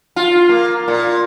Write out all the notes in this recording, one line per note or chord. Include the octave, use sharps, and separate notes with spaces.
F4
A#3
A#2